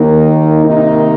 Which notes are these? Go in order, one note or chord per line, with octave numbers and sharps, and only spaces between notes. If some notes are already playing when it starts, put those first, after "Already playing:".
Already playing: D#2 D#3 A#3 D#4
C3 D#3 A#3 D#4